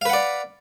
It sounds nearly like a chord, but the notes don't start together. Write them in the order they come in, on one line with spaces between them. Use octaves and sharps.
F5 B4 F#5 D5